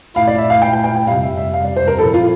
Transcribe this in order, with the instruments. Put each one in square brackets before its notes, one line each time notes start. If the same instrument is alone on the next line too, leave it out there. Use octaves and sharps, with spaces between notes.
[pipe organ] A#2 A3 E4 [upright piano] F5
[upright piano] D5
E5
F5
G5
G5
G5
G5
[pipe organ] F2 C3 G3 [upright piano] F5
[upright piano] E5
E5
F5
D5
C5
A#4
[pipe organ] A#2 F3 C4 E4 [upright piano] A4
[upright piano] F4